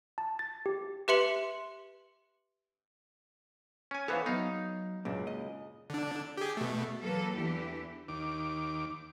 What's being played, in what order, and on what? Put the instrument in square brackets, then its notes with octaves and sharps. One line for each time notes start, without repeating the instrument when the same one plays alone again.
[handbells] A5
A6
G4
[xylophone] G4 B4 E5 C6 C#7 F#7
[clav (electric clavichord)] C#4 G#5
[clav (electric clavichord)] E3 B3 C#5 [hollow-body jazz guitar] A4 C5 F5
[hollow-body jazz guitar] F#3 B3 [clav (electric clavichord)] D#4 F5
[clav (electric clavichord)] C#2 [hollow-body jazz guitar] F#2 A#2 D4
[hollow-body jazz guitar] D#5
[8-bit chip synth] D3 D4
G4 G#4
B2 A3
[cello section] E3 F#3 A#3 A4 B4
E2 D3 E3 E4 G4
[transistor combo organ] D#2 D6